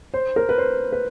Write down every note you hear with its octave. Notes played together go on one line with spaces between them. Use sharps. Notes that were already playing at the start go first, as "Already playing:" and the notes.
C5
A#4
B4
C5
B4